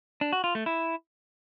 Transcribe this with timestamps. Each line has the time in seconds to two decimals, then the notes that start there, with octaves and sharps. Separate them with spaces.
0.21 D4
0.33 F#4
0.44 F4
0.55 A3
0.66 E4